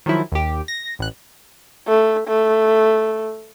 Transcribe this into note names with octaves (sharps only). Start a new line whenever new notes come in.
D#3 F3 F#3 E4
D#2 G4
A#6
A1 F#6
A3
A3